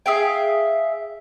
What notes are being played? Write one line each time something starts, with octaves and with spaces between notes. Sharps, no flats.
G#4 E5 F5 G5